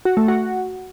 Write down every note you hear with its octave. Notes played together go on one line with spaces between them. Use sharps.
F#4
A3
F#4